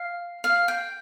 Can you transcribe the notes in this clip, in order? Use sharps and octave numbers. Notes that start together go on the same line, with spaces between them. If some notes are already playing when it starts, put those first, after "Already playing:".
Already playing: F5
F5
G5